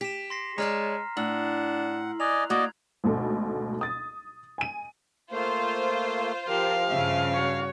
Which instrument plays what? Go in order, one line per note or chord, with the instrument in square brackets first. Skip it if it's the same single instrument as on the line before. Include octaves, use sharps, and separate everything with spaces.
[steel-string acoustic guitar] G4 [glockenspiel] B6 E7
[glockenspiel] C6 A#6 C7
[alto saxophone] G#3 [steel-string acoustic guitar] C#5 D5 A5 [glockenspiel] A#5 F6 C7
[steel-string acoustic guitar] A2 [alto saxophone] D4 [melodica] F#5 [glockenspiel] E6 F#7
[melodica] D5 D#5 G#5 [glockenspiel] F#6 F7
[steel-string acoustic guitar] A#3 [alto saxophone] F#4 [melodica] D5 D#5 [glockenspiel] G#6
[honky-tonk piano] G#1 D2 B2 A4
D#6 A6
G#5 D#7
[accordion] A3 A#3 [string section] F4 C5
[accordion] F3 [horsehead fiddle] G4 A#4 [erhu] F5
[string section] G2 C#3 [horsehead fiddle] E5
[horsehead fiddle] F#4 C#5